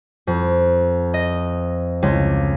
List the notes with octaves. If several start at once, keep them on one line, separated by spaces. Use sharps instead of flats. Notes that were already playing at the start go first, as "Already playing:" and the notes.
F2
D#5
C#2